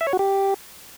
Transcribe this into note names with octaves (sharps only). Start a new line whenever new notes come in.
E5
C#5
F#4
G4